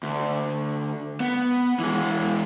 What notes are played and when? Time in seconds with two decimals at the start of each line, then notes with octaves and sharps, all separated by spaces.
0.03 D2
1.20 B3
1.79 E3 G#3